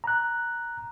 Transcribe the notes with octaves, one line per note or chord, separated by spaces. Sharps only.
A#5 F#6